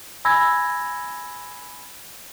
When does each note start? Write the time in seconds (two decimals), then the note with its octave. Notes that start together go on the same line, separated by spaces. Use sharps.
0.25 G#5 B5 E6 G#6 A#6